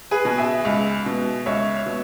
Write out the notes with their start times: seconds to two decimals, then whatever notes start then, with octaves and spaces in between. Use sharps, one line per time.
0.11 G#4 B4
0.25 B2
0.38 E5 G#5
0.65 C#2
1.06 B2
1.46 C#2 C#5 E5
1.86 B2